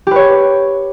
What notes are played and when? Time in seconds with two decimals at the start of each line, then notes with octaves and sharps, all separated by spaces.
0.07 G4
0.11 B4
0.16 C#5